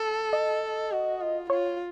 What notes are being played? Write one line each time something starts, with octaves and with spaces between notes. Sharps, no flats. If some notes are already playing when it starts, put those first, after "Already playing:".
Already playing: A4
D#5
F#4
F4
F4 C#5